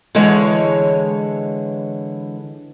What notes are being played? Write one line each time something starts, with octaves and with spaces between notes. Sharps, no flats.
D3 E3 G#3 C#5